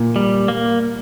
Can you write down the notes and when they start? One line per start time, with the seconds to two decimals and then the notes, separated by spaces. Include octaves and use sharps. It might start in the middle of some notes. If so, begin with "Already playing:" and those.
Already playing: A#2
0.16 G3
0.48 A#3